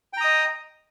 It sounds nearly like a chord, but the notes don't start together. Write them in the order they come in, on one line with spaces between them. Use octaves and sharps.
G5 A#5 D#6 D#5